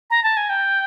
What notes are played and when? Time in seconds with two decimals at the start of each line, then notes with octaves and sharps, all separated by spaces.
0.10 A#5
0.23 A5
0.37 G#5
0.50 G5